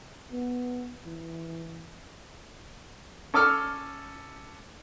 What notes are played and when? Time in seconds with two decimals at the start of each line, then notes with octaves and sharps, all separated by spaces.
0.33 B3
1.06 E3
3.34 C#4 A4 D6 E6 F6